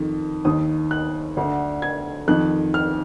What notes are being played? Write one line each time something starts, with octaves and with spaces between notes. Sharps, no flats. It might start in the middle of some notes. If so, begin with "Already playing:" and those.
Already playing: F2 D#3
D#2 D#3 D#6
F#6
D2 D3
G#6
F2 D#3 F#6
F6